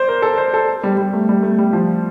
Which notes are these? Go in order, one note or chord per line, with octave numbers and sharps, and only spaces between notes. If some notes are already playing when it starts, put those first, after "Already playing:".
Already playing: C5 D5
A#4
A4
C5
A4
G3
G3
A3
G3
A3
G3
F3